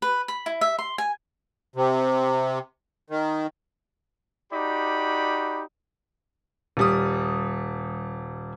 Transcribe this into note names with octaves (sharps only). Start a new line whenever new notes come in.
B4
B5
E4
E5
C6
G#5
C3
D#3
D#4 F#4 G4 D5 B5
D#1 G3 D#6